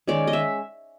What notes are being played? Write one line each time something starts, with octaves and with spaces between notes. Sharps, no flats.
D#3 G#3 C#4 D5
D#5
E5